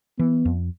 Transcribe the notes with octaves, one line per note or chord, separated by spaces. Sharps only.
E3 B3
F2